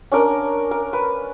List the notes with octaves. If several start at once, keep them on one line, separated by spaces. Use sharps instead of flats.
C#4 D4 A#4
A#4
B4